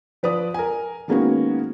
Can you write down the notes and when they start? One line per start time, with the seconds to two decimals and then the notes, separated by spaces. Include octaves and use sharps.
0.23 F3 B4 D5 D#6
0.54 A#4 G#5
1.08 D#3 G#3 A#3 B3 C#4 F#4